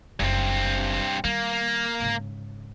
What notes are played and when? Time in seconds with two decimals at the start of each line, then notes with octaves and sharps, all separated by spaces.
0.20 F#1 G2 C4
1.24 D#3 G3 A#3
2.00 G#2 C#3